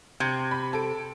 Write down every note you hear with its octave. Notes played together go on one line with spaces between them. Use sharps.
C3 G6 G#6
B5
A4 D7